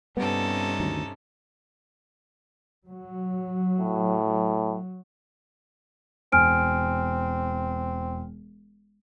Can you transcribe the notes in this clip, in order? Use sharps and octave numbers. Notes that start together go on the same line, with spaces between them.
G2 C3 G3 B3 C#4 D#4 A4
D2 D#3
F#3
A2
E1 C4 G#5 F6 D7